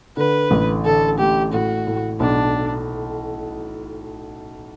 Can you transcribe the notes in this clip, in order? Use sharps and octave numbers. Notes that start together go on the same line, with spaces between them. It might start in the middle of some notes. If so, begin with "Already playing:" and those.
D3 B4
A1
D3 A4
A3 G4
A2 F#4
A2
B1 D4